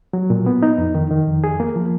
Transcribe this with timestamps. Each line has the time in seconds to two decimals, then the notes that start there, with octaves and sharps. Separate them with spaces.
0.13 F#3
0.30 A#2
0.46 B3
0.63 D#4
0.78 F2
0.95 D#3
1.10 D#3
1.27 F2
1.44 G#4
1.60 A#3
1.76 F3